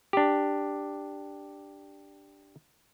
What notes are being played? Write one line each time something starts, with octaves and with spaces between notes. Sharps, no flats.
D4 G4